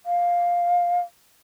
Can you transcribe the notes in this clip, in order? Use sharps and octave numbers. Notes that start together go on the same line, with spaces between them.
F5